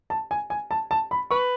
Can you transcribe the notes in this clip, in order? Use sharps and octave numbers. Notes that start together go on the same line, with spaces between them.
A5
G#5
G#5
A5
A5
B5
B4 C#6